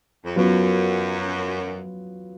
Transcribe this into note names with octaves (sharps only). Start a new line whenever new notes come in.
F2
F#2 F#3 B3 F4